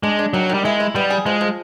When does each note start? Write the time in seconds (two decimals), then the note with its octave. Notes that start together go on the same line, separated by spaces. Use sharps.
0.03 G#3 D4
0.19 D4
0.34 D#3 F#3
0.49 D#3 G3
0.65 G#3 E4
0.80 E4
0.95 G3 B3
1.10 G#4
1.26 F3 G#3
1.41 F3